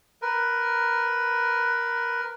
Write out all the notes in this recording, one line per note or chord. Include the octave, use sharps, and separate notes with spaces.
A#4 B4